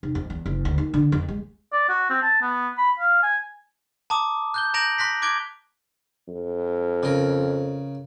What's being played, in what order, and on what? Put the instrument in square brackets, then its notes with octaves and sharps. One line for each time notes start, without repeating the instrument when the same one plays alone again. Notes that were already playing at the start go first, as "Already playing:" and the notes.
[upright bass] F1
F2
E2
F#1
D2
D#2
D3
F2
G#3
[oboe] D5
F#4
C4
A5
B3
B5
F5
G#5
[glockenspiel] A5 A#5 D6 D#6
F#6 G6 G7
A#5 G6 A#6 D7 F7 F#7
C6 F#6 A#6 B6
D6 F#6 G#6 D7 G7
[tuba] F2
[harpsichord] C#3 A#4